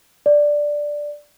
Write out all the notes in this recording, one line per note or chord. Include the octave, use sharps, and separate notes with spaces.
D5